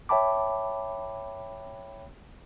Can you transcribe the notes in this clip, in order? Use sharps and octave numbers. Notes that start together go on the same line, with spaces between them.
C#5 E5 G5 A5 B5 D6